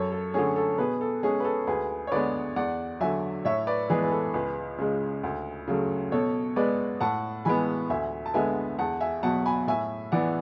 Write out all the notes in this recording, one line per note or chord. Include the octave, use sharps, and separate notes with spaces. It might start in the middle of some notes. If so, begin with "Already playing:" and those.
Already playing: F#2 A4 C#5
A4
D3 A3 C#4 G#4
A4
B2 G#4 B4
A4
G#3 C#4 G#4
B4
A4
D2 G#4 B4
C#5
D3 G#3 B3 B4 D5
E2 D5 F#5
D3 F#3 E5 G#5
A2 C#5 E5
B4 D5
E3 G#3 B3 G#4 B4
B4
A4
C#2 G#4 B4
C#3 G#3
D2
C#3 F#3 A3
B2 A4 C#5
G#3 B3 B4 D5
A2 F#5 A5
E3 G#3 B3 G#5 B5
D2 E5 G#5
A5
D3 G#3 B3 E5 G#5
E2 F#5 A5
E5 G#5
B2 F#3 F#5 A5
G#5 B5
A2 E5 G#5
E3 B3 D5 F#5